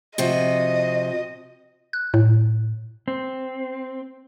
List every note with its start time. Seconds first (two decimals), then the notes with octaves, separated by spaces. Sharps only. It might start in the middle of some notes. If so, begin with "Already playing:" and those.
0.18 C3 F3 F#4 D#5
1.93 F#6
2.14 A2
3.08 C4